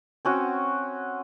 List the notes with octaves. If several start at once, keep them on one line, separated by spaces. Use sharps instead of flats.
C4 C#4 F#4